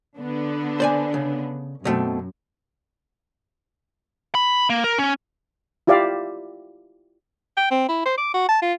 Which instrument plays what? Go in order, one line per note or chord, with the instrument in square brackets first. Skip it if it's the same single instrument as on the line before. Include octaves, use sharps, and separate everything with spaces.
[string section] D3 B3 D4
[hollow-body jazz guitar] C5 D5 G#5
C#3
[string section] F#2 [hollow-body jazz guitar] B2 A3 C4
[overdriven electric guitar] B5
A#3
A#4
C#4
[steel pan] E4 F4 G4 D5 E5 F5
[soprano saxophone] G5
C4
E4
C5
D6
F#4
A5
F4